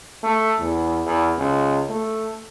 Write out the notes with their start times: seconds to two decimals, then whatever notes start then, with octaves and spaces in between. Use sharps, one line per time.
0.23 A3
0.59 E2
1.06 E2
1.38 C#2
1.90 A3